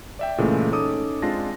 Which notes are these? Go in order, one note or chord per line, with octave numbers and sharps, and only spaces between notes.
D5 E5 G5
A#2 C#3 E3 G#3 A3
C#4 D#4 A4 D6 D#6
G#3 C4 D4 F4 A5 A#6